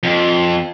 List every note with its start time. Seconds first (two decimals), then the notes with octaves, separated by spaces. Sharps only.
0.03 F2